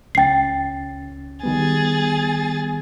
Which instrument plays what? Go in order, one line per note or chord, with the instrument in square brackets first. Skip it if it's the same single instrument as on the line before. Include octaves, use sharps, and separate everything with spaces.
[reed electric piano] C#2 C#4 A6 [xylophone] G5 C7
[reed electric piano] D#3 G3 B3 [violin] G#4 A6